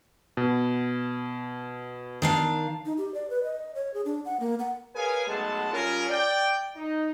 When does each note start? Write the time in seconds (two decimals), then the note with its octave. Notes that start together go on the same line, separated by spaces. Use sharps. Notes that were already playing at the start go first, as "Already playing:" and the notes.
0.37 B2
2.22 D#3 D4 F5
2.86 D#4
2.98 G4
3.14 D5
3.30 B4
3.43 D#5
3.75 C#5
3.94 G#4
4.05 D4
4.25 F#5
4.40 A#3
4.60 F#5
4.95 G#4 A#4 B4 C#5 F5 G#5
5.27 B1 G#3 A3 F#5 A5
5.72 G3 C#4 F4 G#4 A#4
6.09 D5 G5
6.76 D#4